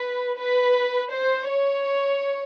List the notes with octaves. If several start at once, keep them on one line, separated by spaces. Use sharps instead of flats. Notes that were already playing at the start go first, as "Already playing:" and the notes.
Already playing: B4
B4
C5
C#5